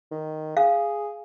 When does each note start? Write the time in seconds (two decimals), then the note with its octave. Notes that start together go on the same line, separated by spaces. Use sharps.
0.11 D#3
0.57 G#4 F5